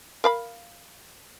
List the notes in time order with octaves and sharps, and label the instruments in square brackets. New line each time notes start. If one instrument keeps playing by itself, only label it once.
[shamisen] A#4 F5 B5